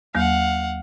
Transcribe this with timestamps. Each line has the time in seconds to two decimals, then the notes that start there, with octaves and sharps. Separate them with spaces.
0.15 D#2 F#3 A#3 F5 F#5